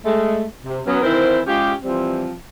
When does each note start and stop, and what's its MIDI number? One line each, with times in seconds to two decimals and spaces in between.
0.04 0.43 56
0.04 0.43 57
0.65 0.79 48
0.87 0.99 54
0.87 0.99 59
0.87 0.99 61
1.01 1.40 51
1.01 1.40 52
1.01 1.40 60
1.01 1.40 64
1.01 1.40 70
1.01 1.40 72
1.46 1.72 56
1.46 1.72 61
1.46 1.72 65
1.46 1.72 67
1.83 2.30 52
1.83 2.30 53
1.83 2.30 55
1.83 2.30 60